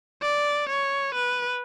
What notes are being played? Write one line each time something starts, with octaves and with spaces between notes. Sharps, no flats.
D5
C#5
B4